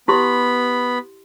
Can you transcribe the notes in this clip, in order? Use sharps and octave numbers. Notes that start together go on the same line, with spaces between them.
B3 E4 G4 B5 C6